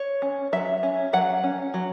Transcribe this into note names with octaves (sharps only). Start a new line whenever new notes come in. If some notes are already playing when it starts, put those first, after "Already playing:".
Already playing: C#5
C#4
F#3 E5
C#4
F#3 F#5
C#4
F#3